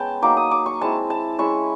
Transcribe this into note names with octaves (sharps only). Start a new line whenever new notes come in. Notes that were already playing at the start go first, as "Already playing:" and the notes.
Already playing: G#3 B3 C#4 G5 A5
F#3 A#3 D#4 D6
D#6
D6
C#6
G#3 C4 E4 A5
A5
G#3 C#4 E4 C#6